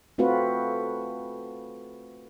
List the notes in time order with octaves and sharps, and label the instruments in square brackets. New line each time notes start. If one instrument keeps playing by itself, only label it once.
[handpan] A3 C4 F4 F#4 B4